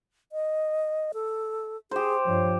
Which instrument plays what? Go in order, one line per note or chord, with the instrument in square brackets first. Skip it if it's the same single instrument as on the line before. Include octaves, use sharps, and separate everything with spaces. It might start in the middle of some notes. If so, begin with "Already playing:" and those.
[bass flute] D#5
A4
[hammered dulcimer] G4 C5 [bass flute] G#4
[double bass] G2 F3 [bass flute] C#5